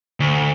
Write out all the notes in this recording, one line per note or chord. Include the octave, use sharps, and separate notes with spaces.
D2